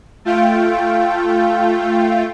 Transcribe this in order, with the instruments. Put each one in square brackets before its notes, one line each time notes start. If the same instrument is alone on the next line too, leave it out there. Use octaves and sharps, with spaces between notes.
[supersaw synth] A3 F4 G5